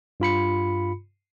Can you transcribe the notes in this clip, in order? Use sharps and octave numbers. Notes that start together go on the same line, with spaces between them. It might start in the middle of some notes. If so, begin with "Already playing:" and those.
G2 F4 B5 C#7